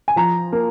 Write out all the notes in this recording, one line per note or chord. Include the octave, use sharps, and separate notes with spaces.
G#5
F3 A#5
A#3